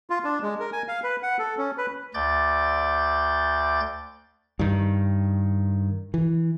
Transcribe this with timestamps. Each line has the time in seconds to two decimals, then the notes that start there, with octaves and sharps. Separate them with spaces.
0.10 F4
0.24 D4
0.42 G#3
0.60 A#4
0.73 G#5
0.88 F5
1.04 B4
1.23 F#5
1.39 A4
1.58 C#4
1.78 B4
2.14 D2 D5 G6 A6
4.59 G2 D#3
6.14 E3